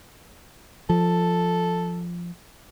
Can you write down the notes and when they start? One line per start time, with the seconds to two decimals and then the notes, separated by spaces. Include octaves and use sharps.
0.89 F3 A4